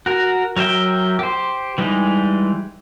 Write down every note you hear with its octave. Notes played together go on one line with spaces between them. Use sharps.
F#4 A#4
F#3 A#4 E5 G5
G4 C5
E3 G3 G#3 D#4